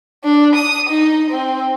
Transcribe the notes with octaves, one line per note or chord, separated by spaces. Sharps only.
D4
D#6
D#4
C4